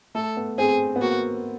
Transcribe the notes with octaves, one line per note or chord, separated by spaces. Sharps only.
A3 A4
B3
C4 G#4
B3
A#3 F#4